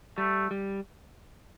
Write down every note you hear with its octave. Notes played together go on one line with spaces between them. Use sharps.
G3 A3
G3